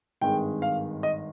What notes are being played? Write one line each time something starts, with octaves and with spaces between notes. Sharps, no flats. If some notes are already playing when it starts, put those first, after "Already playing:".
G#1 G2 D#3 G#3 G5
F5
D#5